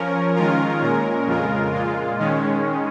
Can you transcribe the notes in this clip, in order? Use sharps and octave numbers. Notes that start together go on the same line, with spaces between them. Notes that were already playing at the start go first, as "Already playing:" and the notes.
Already playing: F3 C#4 A#4
D#3 G#3 C#4 F4 A#4
A#2 G#3 C#4 A#4
F2 C#3 G#3 F4 A#4
A#2 G#3 F4
D#3 G#3 C#4